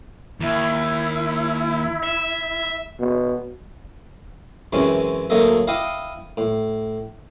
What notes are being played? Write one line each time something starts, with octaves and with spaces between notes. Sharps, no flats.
D#2 E4
E5
B2
F#2 C3 E3 G#3 C#4
D2 F#3 A3 A#3 D#5 E5
E4 D#5 F5 G5 D6 D#6
A2